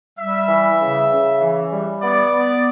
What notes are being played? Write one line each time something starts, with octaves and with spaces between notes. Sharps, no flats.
G3 E5
E3
C#3
C#3
E3
G3
B3 D5
B3